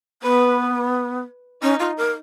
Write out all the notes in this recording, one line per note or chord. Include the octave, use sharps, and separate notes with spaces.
B3 B4
C#4 D#4
F4
A#4